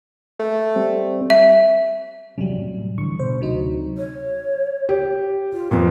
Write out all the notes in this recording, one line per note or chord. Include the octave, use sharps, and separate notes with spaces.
A3
G3 C4
E5
E2 C3 F#3 G3 C#4
A2
D3 E3 C#6
B2 D3 C5
D2 C3 F#3 D#4
C#5
G4
F4
F2 A#2 B4